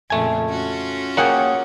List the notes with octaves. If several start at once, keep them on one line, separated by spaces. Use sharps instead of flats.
F2 A#2 C#3 A3 G#5
C#4 F4 F#4
A#3 G#4 C#5 F#5 G5